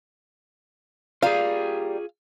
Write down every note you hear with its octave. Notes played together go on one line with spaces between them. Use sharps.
G3 A#3 F4 G#4 F5